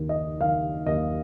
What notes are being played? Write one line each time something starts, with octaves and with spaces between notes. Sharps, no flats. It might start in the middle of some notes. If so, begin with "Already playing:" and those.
Already playing: D#2 D#3
D#5
D#3 F5
D#2 D#5